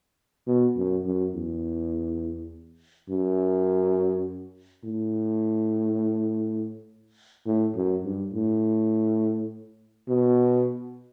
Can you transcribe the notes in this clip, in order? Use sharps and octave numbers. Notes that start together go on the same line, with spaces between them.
B2
F#2
F#2
E2
F#2
A2
A2
F#2
G2
A2
B2